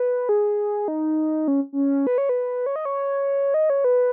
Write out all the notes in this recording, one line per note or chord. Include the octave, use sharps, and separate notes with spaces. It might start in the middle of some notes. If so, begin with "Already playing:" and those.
Already playing: B4
G#4
D#4
C#4
C#4
B4
C#5
B4
C#5
D#5
C#5
D#5
C#5
B4